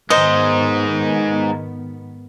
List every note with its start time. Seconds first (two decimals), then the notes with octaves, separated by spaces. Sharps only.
0.10 G#2 D#3 G#3 B3 D#4 C5 D#5